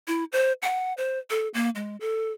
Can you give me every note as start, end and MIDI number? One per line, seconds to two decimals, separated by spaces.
0.08 0.24 64
0.32 0.53 72
0.62 0.93 78
0.97 1.19 72
1.30 1.48 69
1.54 1.70 58
1.75 1.96 56
2.01 2.32 69